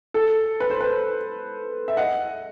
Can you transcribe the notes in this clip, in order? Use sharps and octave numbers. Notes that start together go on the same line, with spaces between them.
A4
B4
C5
B4
E5
D#5 F#5